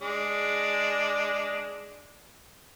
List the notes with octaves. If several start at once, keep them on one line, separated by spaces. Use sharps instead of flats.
G#3 D4